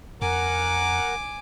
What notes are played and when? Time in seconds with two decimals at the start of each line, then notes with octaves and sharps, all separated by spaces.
0.22 F2 A#4 F#5 G#5 D6